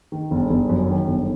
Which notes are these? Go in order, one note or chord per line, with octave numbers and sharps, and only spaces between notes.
D#3
G1
G1
F#2
D#3
G1